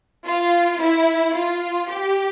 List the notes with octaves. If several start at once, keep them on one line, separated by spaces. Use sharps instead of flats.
F4
E4
F4
G4